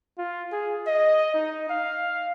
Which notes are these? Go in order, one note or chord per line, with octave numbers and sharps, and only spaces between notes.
F4
G#4
D#5
D#4
F5